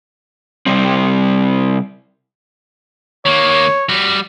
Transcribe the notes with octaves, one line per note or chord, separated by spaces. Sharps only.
C3 G3 C4
D#3 A#3 C#5
G3 F#4